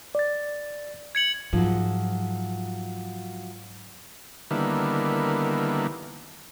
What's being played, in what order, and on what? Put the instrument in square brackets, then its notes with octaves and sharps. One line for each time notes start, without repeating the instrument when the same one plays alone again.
[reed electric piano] D5 A6
[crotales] G#6 C#7 F#7
[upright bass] G#2 [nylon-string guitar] F3 F#3
[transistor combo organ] D3 D#3 G3 A#3 B3 E4